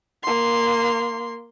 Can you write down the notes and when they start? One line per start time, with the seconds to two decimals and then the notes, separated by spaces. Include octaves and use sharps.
0.23 A#3 C6